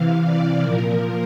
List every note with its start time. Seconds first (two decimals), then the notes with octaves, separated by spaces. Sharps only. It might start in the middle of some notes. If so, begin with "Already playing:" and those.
Already playing: C3 E3 F5
0.24 D5
0.61 A#2 F3 A#4